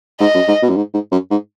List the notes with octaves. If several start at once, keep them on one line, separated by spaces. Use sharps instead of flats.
G#2 D#5
F#2
G#2
B2
F#2
G#2
G#2
F#2
G#2